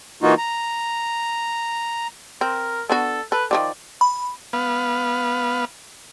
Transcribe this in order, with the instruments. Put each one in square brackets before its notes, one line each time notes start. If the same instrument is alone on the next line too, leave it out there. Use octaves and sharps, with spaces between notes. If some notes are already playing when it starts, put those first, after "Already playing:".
[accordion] E3 A#3 D#4 F4 F#4
A#5
[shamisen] C4 [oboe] A#4
[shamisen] B3 D4 F#4 [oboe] A4
[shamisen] A4 [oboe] B4
[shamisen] D#3 F3 G3 [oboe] D5
[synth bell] B5
[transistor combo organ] B3 B4 F5